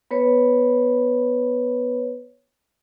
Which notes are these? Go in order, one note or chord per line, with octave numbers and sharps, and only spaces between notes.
B3 B4 C#5